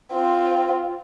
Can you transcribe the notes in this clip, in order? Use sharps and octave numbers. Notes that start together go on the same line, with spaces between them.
C4 F4